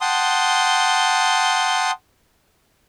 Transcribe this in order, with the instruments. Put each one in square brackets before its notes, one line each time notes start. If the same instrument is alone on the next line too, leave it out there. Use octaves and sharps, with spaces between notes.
[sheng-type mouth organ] F#5 G5 A5 C6 D#6